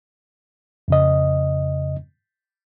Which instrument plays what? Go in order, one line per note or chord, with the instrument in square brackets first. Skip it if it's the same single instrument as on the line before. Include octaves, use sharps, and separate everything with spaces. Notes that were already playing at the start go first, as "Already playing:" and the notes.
[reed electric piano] F2 C#3 D#5